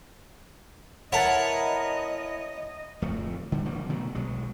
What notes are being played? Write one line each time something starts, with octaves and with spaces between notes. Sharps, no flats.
E4 A#4 B4 C#5 D#5 F#5 A5 A6
D1 F2 F3 A3
D3 G3
D3 F3 G3 A#3
B2 D#3 F#3 A3
B1 F#3 G#3